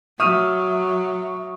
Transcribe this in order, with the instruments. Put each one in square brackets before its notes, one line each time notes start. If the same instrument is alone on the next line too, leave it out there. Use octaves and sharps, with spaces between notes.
[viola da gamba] F#3 [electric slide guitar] E5 [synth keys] C#6 [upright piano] D#6 F6 D#7